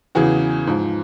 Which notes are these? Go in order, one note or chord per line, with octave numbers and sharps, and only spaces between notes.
E2 C#3 E3 F#4 G#4
G#2 F3